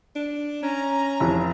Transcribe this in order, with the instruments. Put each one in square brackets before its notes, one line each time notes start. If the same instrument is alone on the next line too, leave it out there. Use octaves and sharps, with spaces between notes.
[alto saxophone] D4
[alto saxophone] C#4 [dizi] A#5
[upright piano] F1 E3